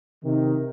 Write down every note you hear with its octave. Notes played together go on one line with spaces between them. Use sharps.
C3 D#3